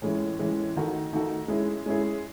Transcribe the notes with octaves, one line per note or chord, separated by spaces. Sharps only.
A2 E3 G#3 C#4 E4
A2 E3 G#3 C#4 E4
D#3 A3 D#4 F#4 A4
D#3 A3 D#4 F#4 A4
G#3 C#4 E4 G#4
G#3 C#4 E4 G#4